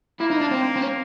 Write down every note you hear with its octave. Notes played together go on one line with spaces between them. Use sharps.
A#3 E4
D#4
D4
C4
C4
C#4